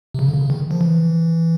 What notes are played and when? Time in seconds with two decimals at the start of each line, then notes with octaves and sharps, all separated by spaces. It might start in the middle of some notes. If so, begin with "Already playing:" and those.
0.14 C3
0.19 C#3
0.28 D3
0.34 C#3
0.50 D#3
0.71 F3
0.81 E3